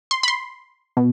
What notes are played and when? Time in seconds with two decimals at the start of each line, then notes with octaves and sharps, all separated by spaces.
0.11 C6
0.23 B5
0.28 C6
0.97 B2